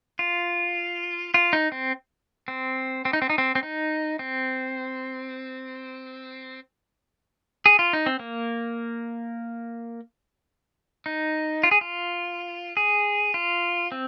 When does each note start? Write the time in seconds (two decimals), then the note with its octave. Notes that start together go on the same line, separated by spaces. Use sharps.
0.19 F4
1.34 F4
1.53 D#4
1.72 C4
2.48 C4
3.05 C4
3.13 D#4
3.22 C4
3.30 D#4
3.38 C4
3.55 C4
3.63 D#4
4.19 C4
7.66 G#4
7.79 F4
7.93 D#4
8.06 C4
8.19 A#3
11.06 D#4
11.63 F4
11.71 G#4
11.81 F4
12.77 G#4
13.34 F4
13.92 C4